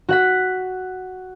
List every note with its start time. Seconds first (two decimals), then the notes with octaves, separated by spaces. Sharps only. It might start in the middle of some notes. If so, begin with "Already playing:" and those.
0.09 F#4 F#5 B6